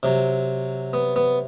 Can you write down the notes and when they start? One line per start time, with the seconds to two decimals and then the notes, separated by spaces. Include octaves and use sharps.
0.03 C3 F#3
0.93 B3
1.16 B3